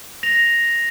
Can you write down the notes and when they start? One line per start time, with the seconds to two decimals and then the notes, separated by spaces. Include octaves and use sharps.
0.23 A#6 F7